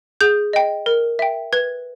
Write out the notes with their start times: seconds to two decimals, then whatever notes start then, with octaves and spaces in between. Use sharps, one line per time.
0.21 G#4 G6
0.53 D#5 G5
0.86 A#4
1.19 E5 G5
1.53 B4 G#6